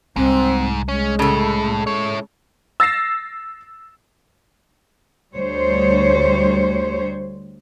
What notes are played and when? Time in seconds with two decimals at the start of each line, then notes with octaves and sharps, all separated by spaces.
0.16 C2 G#2 C4
0.88 G#3 C#4
1.19 A2 C#3 A4
1.87 E4 C#5
2.80 E6 A6 A#6 C7 E7
5.35 D2 G3 C5 C#5